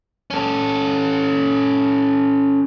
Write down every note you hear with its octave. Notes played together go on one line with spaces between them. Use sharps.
C#4 A4